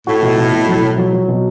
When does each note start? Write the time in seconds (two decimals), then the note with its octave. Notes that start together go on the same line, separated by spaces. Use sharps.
0.07 A2 F#4
0.22 B2
0.38 B2
0.53 B2
0.68 F#3
0.82 B2
0.98 F#3
1.13 F#3
1.28 B2